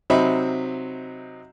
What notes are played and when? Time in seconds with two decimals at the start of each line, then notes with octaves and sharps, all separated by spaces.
0.10 C3 F#3 C4 D#4 E5 B5